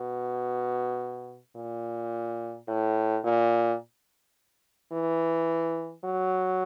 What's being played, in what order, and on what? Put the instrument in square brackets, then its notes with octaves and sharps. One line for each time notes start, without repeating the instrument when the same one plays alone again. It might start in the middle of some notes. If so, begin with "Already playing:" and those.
Already playing: [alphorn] B2
A#2
A2
A#2
E3
F#3